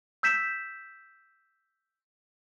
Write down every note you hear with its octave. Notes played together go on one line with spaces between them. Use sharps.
E6 G6 B6 E7